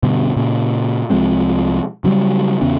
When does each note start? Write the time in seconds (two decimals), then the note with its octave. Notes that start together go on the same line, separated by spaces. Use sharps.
0.03 G2 B2 D3
0.37 A#2 C#3
1.10 C2 F3 G#3 C4
2.04 C#3 E3 F#3 G3
2.61 E2 C#3 B3 C#4